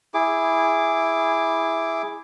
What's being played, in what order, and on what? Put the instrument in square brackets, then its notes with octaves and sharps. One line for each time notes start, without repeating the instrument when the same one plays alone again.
[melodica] E4 G#4 D6